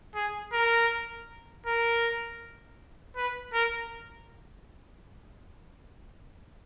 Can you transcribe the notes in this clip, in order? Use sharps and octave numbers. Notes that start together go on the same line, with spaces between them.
G#4
A#4
A#4
B4
A#4